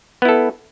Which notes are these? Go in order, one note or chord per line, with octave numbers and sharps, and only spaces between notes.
B3 E4 A4